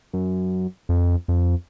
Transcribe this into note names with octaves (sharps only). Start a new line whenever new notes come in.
F#2
F2
F2